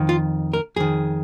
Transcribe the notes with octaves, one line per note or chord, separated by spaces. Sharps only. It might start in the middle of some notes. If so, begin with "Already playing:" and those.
Already playing: F2 D#3
F4
A#4
F2 D#3 G#4